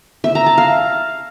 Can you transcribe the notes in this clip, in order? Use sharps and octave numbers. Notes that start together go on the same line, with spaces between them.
E5
A#5
A5
F5